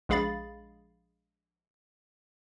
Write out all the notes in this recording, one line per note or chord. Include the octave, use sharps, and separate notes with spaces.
A#1 G#3 G#4 F5 B5 A6